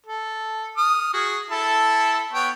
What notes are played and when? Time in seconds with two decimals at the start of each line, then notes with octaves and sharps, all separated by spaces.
0.06 A4
0.77 D#6 F6
1.13 F#4 G#4
1.51 E4 A4 A5
2.33 B3 C#5 G5